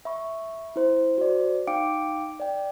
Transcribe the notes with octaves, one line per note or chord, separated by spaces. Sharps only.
E5 B5 C#6
E4 C5
F#4 C5 D5
D#4 F5 G5 D6 C#7 D7
D5 G5